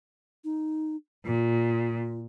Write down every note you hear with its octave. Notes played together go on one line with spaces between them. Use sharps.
D#4
A#2 F4